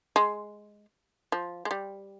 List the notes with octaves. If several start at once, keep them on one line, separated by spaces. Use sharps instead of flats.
G#3
F3
G#3
G3